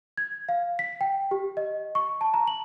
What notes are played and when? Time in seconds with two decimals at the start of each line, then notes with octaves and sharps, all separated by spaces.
0.17 G#6
0.49 F5
0.79 B6
1.01 G5
1.31 G4
1.57 D#5
1.95 C#6
2.21 A5
2.34 A#5
2.47 F#7